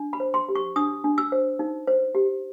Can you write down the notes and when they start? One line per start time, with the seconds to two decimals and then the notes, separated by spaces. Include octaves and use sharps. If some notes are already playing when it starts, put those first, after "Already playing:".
Already playing: D4
0.13 B5
0.20 C5
0.34 C6
0.49 G4
0.55 C#6
0.76 D4 D#6
1.04 D4
1.18 E6
1.32 C5
1.59 D#4
1.87 C5
2.15 G4